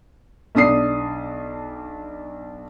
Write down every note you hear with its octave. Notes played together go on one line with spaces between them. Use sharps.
B1 D4 D#6 C7